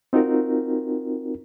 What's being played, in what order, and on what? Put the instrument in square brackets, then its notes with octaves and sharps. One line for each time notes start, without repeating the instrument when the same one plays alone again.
[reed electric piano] C4 D#4 F4 F#4 A#4